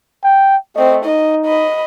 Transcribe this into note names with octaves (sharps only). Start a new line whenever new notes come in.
G5
A3 C4 D#5
D#4 D#5
D#5 B5